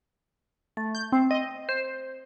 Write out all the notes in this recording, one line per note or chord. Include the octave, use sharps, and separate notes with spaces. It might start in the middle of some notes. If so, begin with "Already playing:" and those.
A3
G6
C4
D#5
C5